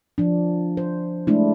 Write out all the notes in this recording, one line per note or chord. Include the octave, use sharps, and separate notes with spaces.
F3 D4
C5
G#3 A3 D4 E4